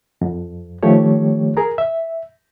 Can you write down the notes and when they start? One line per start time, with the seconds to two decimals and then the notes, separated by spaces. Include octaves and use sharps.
0.21 F2
0.83 D#3 F3 A3 G4 C#5
1.57 G#4 A#4 A#5
1.78 E5